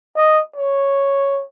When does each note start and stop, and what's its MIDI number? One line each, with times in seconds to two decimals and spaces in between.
0.16 0.43 75
0.56 1.43 73